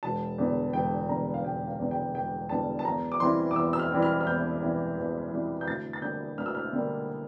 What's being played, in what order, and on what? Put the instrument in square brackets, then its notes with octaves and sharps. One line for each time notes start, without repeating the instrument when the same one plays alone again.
[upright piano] E1 A5
E2 D3 G3
E1 G5
E2 D3 G3 A#5
F5
E1 G5
F5
E2 D3 G3
G5
E1 G5
E2 D3 G3 A5
A5
E2 A#5
D6
E3 G3 C4 E4 C6
D6
E2 E6
E6
F6
E3 G3 C4 E4
F6
F6
E2 G6
E3 G3 C4 E4
E2
E3 G3 C4 E4
G6
D2 A6
A6
D3 G3 A#3 G6
D2 F6
E6
F6
D3 G3 A#3